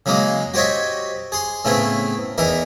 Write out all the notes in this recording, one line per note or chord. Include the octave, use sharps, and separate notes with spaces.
C#3 F#3 G#3 A#3 D#4
F#4 G4 C5 C#5 D#5 E5
G#4 C6
A2 C#3 A3 B3 C4 E4
E2 E3 D#4 E4 A#4